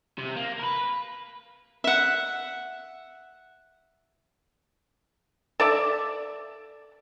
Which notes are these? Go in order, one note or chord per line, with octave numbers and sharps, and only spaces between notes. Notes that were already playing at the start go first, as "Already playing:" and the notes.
C3
A#3
A#4 B4
E5 F#5
A4 D5 E5